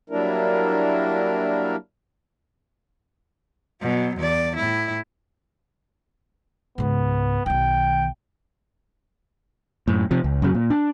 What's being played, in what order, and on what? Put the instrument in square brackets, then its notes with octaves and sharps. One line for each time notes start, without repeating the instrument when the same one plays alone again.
[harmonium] F#3 G3 A#3 D4 E4 A#4
[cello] B2 F#3
E2 D5
A2 E4
[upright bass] C#2 G#2 [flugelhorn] B3
[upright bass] B1 D#3 [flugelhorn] G5
[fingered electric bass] F#2 A2
C3 F3
C#2
F#2 C#3 F#3
A#2
D4